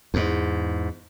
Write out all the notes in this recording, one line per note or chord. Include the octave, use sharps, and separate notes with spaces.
E2 G#2